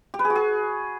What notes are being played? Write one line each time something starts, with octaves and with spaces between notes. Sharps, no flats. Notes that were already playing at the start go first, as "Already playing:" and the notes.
G4
B4
G#4
F#4
G#4